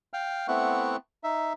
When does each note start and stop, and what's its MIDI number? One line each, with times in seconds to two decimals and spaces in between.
0.13 0.47 77
0.13 0.47 79
0.13 0.47 89
0.48 0.96 57
0.48 0.96 59
0.48 0.96 60
0.48 0.96 64
0.48 0.96 78
0.48 0.96 85
1.24 1.53 63
1.24 1.53 76